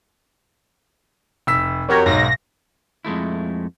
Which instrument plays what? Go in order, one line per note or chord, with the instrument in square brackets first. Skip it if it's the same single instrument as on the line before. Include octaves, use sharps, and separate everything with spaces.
[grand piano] F1 E6 B6
[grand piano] F2 F#4 G4 [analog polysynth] A#4 C#5
[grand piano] B1 G#2 [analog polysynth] A#6
[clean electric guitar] F2 G#3 A3 E4